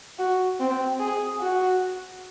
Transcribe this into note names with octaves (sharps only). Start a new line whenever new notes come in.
F#4
C4
G#4
F#4